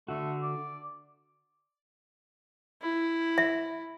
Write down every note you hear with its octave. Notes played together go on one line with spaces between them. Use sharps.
D3 A3 F#4
D5
E4
E5